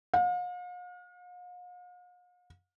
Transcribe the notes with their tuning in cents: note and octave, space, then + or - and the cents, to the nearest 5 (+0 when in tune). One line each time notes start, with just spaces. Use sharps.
F5 +45